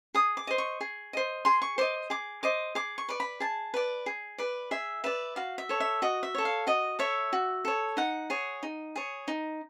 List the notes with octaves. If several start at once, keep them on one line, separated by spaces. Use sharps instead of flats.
G#4 D#6
D6
C5 D#5
C#6
G#4
C5 D#5
G#4 C6
C#6
C5 D#5 D6
G#4 D6
C5 D#5 D6
G#4 D6
C#6
B4 D5
B5
G#4 A5
B4 D5
G#4
B4 D5
G#4 E5
B4 D5 E5
F#4 F5
E5
A4 C#5
E5
F#4 D#5
E5
A4 C#5
F5
F#4 D#5
A4 C#5 E5
F#4
A4 C#5
D#4 F#5
G#4 C#5
D#4
G#4 C#5
D#4